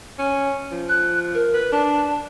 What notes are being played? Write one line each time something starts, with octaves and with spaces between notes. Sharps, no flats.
C#4
F3
F#6
A#4
B4
D4 A5